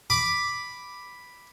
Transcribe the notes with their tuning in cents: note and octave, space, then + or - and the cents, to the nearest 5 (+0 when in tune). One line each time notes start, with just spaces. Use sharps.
B5 +0 D6 +0